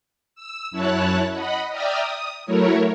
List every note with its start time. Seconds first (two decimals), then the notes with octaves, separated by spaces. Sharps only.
0.35 E6
0.71 F#2 E4 C#5 A5 F#6
1.33 D#5 F#5 B5
1.70 D5 E5 G5 A#5 D#6 F6
2.01 D#6
2.46 F#3 A3 E4 A#4 C#5